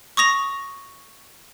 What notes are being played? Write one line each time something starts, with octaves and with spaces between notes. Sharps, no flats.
C#6 D#6 A#6 F7